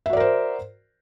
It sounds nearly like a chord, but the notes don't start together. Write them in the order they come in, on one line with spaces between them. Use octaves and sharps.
E5 F#4 D5 A#4 C5